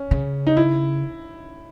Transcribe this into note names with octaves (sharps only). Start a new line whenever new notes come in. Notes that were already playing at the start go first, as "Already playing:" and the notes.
Already playing: C#4
C#3
D#4
E4